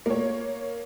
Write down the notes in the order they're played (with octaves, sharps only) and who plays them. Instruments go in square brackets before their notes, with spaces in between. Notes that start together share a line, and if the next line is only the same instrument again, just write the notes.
[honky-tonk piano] A#3 C#5